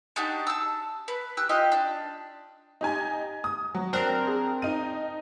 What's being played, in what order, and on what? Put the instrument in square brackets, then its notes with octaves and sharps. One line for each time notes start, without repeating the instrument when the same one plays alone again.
[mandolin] D4 D#4 F#4 G4
A5 E6
B4
G4 E6 F#6
F4 G4 D#5
D4
[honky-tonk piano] D#4 G4 G#5
D#6
F#3
[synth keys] C4 D4 A#4 [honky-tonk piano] F#6
[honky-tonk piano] G#4
D#4 D#7